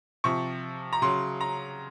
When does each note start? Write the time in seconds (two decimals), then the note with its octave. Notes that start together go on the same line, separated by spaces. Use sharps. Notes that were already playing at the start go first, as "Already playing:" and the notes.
0.24 C3 F3 C#6
0.93 A#5
1.02 C#3 F#3 C6
1.41 A#5